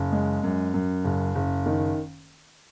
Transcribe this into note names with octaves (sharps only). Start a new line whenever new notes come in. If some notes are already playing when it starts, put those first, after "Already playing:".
Already playing: F#1
G#3
F#2
F#2
F#1
F#1
D#3